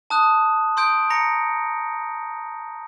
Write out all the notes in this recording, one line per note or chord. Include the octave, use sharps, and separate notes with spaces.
A5 D#6 F#6
C6 D#6 G6 D7
A#5 A#6 C#7